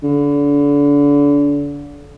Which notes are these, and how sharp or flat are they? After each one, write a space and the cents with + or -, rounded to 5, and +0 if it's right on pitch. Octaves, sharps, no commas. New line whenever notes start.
D3 -35